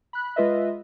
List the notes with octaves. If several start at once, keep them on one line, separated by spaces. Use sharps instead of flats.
B5 F#6
G#3 F4 B4 D#5 E5